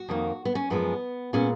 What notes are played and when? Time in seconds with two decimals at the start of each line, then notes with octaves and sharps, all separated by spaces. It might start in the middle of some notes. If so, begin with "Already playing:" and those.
Already playing: F#4
0.09 F2 D#3 A#3
0.45 B3
0.55 C#4
0.70 F#2 F3 G#3 B3
1.33 A#2 G#3 B3 C#4